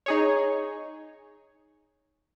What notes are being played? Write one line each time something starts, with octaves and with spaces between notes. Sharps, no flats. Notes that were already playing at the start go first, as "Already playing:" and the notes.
D#4 G#4 C#5